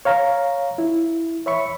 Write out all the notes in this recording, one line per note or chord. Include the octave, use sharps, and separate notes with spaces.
C#5 F5 A#5
E4
C#5 E5 B5 C#6